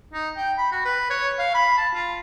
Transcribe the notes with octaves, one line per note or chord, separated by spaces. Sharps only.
D#4
G5
B5
F#4
B4
C#5
F5
B5
A5
F4